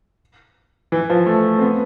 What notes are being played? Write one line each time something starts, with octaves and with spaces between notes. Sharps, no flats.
E3
F3
A3
C4
B3